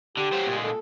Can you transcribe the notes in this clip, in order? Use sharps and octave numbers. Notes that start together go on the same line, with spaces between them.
D3 G4
F#3 C5
A#2 G#3
A4